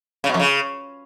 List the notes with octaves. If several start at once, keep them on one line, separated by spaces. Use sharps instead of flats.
C#3
B2
F2
C#3